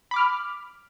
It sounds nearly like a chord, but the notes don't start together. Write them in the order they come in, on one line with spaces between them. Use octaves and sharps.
B5 D6 F6